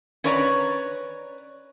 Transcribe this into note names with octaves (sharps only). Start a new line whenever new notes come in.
C#4 B4 C#5 D5 G5 A#5